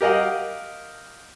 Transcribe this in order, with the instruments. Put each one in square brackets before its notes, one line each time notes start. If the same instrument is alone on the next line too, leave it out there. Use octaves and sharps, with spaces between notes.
[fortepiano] G4 A#4 D#5 F5 F#5